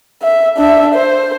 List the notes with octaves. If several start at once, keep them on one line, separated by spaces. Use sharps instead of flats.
E5
D4 E5
C5